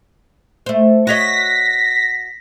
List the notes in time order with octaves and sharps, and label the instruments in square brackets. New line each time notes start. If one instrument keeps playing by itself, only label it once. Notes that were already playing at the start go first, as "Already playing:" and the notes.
[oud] A3 C5
[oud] F#4 C#5 D#5 [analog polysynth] A#6 B6